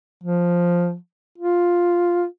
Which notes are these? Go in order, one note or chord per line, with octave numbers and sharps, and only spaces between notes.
F3
F4